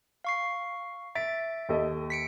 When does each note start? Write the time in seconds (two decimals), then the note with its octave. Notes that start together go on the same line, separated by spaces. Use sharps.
0.24 F5 C#6 C7
1.15 E5 A6 B6 D7
1.69 D#2 A4 D#5
2.10 B6 C#7 D7